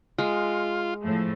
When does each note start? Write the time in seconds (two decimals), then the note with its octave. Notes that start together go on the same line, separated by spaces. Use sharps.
0.18 G#3 F4
1.02 A2 F3 A3